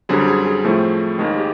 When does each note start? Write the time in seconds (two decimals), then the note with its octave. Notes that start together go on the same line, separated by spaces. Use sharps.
0.09 F#2 D3 G3 C4 G#4
0.28 G#4
0.45 G#4
0.64 A2 F3 A3 C4
1.18 D#2 D#3 G#3 C4 G#4
1.37 G4